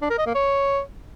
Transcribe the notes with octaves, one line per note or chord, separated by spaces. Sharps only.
D4
A#4
D#5
A#3
C#5